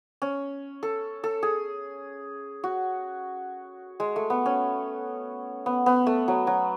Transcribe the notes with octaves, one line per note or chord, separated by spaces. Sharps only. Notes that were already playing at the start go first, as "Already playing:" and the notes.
C#4
A4
A4
G#4
F#4
G#3
A3
B3
C#4
B3
B3
A3
F#3
F#3